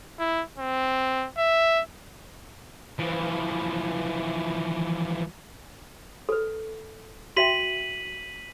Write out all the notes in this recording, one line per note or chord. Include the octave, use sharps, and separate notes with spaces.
E4
C4
E5
E3 F3
A4 B4
F#4 E5 G5 B6 D#7 F#7